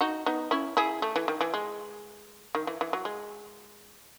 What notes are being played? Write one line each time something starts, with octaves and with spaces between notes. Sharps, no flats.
D#4 F#4
B3 D#4
C#4 E4
E4 G#4
A3
E3
D#3
E3
G#3
D#3
E3
E3
F#3
G#3